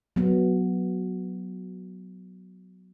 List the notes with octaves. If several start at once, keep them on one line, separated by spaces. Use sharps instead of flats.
F#3 B3